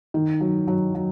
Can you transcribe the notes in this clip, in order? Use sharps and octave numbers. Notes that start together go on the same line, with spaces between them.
D#3
F#3
F#3
F#3